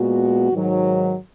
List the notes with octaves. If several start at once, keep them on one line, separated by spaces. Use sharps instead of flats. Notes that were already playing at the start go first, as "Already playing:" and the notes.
Already playing: A#2 G#3 B3 F#4
G#2 D#3 F#3